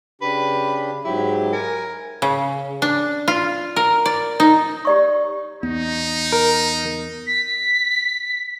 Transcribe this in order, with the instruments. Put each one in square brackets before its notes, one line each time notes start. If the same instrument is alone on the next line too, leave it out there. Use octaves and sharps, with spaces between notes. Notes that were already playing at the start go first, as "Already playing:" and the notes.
[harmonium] C#3 D4 G4 [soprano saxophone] B4
[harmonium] G#2 F#3 G4 [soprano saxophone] E4
[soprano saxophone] A#4 [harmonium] G#5
[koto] C#3
D4
F4
A#4
D5
D#4
[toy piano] G4 D5 C#6
[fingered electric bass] E2 B3 [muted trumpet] D#4
[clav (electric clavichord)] A#4
[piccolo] B6